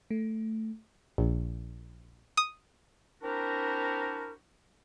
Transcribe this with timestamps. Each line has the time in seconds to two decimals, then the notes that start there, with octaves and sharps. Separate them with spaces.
0.11 A3
1.18 A#1
2.37 D#6
3.22 C4 D4 E4 F#4 G4 A#4